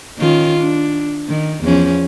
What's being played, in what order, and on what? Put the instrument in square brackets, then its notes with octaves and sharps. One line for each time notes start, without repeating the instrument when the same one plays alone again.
[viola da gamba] D#3 C#4 F4
D4
D#3
E2 F3 C#4